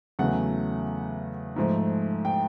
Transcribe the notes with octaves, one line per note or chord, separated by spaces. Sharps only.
E2 C#3 F#3 A3 F#5
G#2 F3 A3
G5